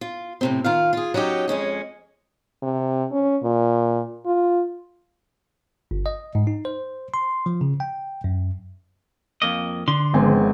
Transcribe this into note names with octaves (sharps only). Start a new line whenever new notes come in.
F4
A2 C3 C4
D#3 F4 F5
F4 G#4
F#3 C#4 D#4 G4
F2 G#3 C#4 G#4
C3
C#4
A#2
F4
G1
D#5
G#2
D#4
C5
C6
F3
C#3
G5
F#2
F2 A#3 D#5
D3 C6
G#1 F3 G#3 B3 C4 G#5